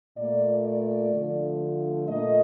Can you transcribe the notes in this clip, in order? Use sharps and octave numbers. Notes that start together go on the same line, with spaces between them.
A#2 A3 D5
D5
D3 F3 A3
A#2 A3 D#5